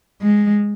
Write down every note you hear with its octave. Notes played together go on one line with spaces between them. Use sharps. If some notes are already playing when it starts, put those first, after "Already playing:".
G#3